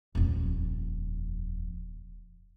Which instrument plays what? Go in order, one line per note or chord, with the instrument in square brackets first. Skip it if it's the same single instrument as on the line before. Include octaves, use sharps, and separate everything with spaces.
[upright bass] D#1 F2